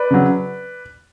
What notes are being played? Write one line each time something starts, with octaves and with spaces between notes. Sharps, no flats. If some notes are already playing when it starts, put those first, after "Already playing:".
Already playing: B4 D5
C#3 F#3